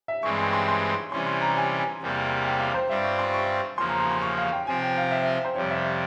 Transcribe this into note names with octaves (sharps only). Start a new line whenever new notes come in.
E5
G2 E3 G#3 C4 C#6
C6
C6
C6
C6
C3 E3 G3 C#4 C6
C6
A#5
G#5
G#5
E2 C3 G3 A#3
G5
F5
C5
G2 G3 C4 F4 E5
C#6
C6
C#6
E2 C#3 F3 A#3 C6
A#5
A#5
C6
C#6
F5
G5
C3 F3 C4 F4 G#5
G5
F5
E5
E5
C5
F2 C3 G3 C#5
E5